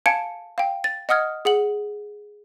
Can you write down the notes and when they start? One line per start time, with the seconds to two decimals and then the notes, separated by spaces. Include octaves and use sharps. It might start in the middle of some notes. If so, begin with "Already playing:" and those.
0.06 F5 G#5 A5 G#6 C#7 D7
0.58 F5 G5
0.84 A6
1.09 D#5 F#5 D#6 F6 G#6
1.45 G#4 F#5 F#7